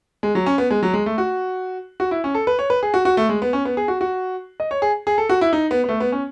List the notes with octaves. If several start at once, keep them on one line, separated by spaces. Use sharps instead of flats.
G#3
F#3
C#4
B3
G#3
F#3
G#3
A3
F#4
F#4
E4
C#4
A4
B4
C#5
B4
G#4
F#4
F#4
A3
G#3
B3
C#4
B3
G#4
F#4
F#4
D#5
C#5
G#4
G#4
A4
F#4
E4
D#4
B3
B3
A3
B3
C#4